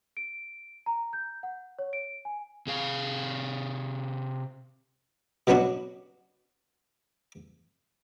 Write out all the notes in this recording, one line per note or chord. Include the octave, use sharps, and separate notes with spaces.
D7
A#5
G6
F#5
C#5
D7
G#5
C3 G#4 F5
B2 F#3 B3 C#4 D4 F#4